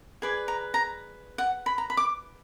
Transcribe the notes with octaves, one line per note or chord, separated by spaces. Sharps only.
G#4 B4 D5 G#5
A#5
A#5
F#5
B5
A#5
B5
D6